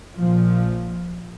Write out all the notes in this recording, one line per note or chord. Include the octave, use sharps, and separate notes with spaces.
A#1 A#2 F3